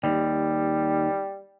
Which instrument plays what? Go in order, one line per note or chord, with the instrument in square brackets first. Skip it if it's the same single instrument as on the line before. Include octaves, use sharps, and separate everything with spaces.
[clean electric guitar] D#2 [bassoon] G3